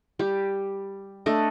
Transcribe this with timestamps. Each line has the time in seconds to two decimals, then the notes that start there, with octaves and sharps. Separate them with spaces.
0.19 G3 G4
1.26 A3 D4 A4 D#5